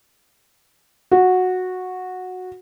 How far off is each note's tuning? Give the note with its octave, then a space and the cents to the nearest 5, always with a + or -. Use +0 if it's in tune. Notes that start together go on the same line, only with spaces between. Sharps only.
F#4 -10